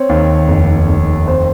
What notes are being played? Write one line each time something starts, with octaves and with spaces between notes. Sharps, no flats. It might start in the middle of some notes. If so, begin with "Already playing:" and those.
Already playing: C4 C#5
D#2
F1
F1
C4 C5